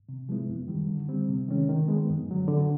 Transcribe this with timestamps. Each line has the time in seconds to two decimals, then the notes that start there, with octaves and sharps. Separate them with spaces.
0.09 C3
0.29 F3 G#3 B3 E4
0.49 F#2
0.68 D#3 G3
0.89 D3
1.08 G3 C4
1.29 C3
1.48 D#3 G#3 C#4
1.69 D#3
1.88 G#3 B3
2.09 F#2
2.29 D3 F#3
2.48 D3